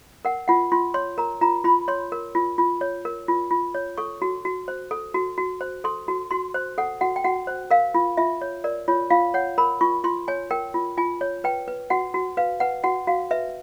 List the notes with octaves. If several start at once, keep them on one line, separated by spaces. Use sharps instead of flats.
A#4 F#5
F4 F#5
F4 C6
C#5 C6
A#4 A#5
F4 A#5
F4 B5
C#5 C6
A#4
F4
F4
C#5
A#4
F4
F4
C#5
A4 C#6
F#4
F#4
C5
A4
F#4
F#4
C5
A4 C6
F#4
F#4 C6
C5
A4 F#5
F#4 F#5
G5
F#4 F#5
C5
A#4 F5
F4
F4 E5
C#5
A#4 D5
F4 C#5
F4 F5
C#5 F#5
A#4 B5
F4 C#6
F4 C6
C#5 G#5
A#4 G5
F4
F4 G#5
C#5
B4 G5
B4
F#4 F#5
F#4
B4 F5
B4 F#5
F#4 F#5
F#4 F5
B4 E5